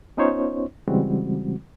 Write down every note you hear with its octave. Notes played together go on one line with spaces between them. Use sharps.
B3 C#4 D#4 F4 C5 C#5
C#3 E3 G3 G#3 C4 F#4